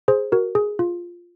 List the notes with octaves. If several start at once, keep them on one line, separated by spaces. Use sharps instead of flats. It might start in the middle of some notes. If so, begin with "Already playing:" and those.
G#4 C5
F#4 A#4
G#4
F4